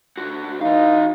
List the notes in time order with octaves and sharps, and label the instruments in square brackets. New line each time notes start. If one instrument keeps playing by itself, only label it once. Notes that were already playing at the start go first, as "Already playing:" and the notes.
[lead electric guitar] D3 F#4
[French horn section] E3 D#4 [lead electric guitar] F#4 F5